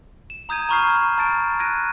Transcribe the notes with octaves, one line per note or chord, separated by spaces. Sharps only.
E7
A#5 D#6 G6 G#6 D#7
A#5 B5 C#6 F6 G6 C7
A5 A6 D7
F#6 G#6 A#6 D7 D#7